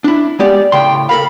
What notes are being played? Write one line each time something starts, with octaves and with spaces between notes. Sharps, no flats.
D4 E4
G#3 B3 G4 D5
A2 C#3 G5 C6
A4 A#4 F5 B5